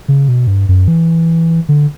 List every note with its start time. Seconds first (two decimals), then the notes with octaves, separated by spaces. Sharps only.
0.08 C#3
0.28 B2
0.47 G2
0.69 F#2
0.88 E3
1.69 D3